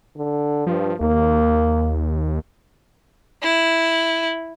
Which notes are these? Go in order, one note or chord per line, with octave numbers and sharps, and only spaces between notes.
D3
G2 F3
D#2 A#3
E4